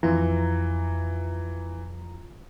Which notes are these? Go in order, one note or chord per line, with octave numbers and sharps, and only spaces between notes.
F2 E3 F4 A#5